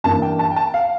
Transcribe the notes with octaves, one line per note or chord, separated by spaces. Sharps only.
G2 E3 A#3 D4 A5
G5
A5
G5
A5
F5